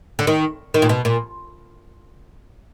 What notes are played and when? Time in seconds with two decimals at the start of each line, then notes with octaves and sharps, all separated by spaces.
0.19 D3
0.27 D#3
0.74 D#3
0.82 A#2
0.89 B2
1.05 A#2